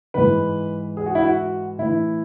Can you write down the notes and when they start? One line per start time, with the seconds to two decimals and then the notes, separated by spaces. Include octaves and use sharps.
0.14 G#2 E3 B4
0.97 G#4
1.06 F#4
1.15 E4
1.24 F#4
1.78 A2 E3 E4